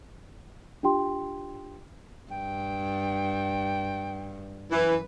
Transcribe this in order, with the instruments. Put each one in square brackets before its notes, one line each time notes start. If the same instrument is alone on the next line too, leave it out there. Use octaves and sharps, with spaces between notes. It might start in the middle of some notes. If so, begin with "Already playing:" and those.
[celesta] D4 F4 G4 G5 C6
[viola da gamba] G2 [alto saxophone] G5
[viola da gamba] F#2 B4 [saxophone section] E3